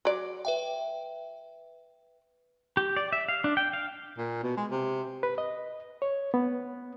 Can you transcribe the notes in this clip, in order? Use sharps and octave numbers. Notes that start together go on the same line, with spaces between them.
F#3 D5
B4 E5 G5
G4
D5
E5
F5
D4
G5
F5
A#2
B2
G#3
C3
B4
D#5
C#5
B3